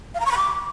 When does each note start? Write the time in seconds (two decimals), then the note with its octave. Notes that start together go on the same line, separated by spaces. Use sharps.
0.14 F5
0.20 A#5
0.26 C#6
0.31 B5
0.37 D6